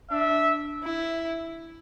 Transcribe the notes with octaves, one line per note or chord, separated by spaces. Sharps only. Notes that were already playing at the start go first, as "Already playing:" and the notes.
D4 E5
E4